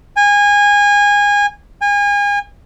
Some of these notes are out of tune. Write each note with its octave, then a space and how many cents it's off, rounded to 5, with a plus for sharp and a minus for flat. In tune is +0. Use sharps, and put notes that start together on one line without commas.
G#5 -25
G#5 -35